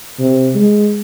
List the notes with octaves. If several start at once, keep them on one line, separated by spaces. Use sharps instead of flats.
C3
G#3